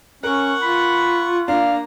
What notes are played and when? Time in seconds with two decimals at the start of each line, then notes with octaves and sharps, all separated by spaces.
0.23 C#4 A#4 F#5 C#6
0.62 F4 B5
1.48 A#3 D4 F5 A#5